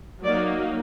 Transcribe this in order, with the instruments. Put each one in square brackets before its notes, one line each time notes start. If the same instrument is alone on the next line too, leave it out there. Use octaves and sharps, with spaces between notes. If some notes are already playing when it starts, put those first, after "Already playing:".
[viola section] F#3 A#3 D#4 D5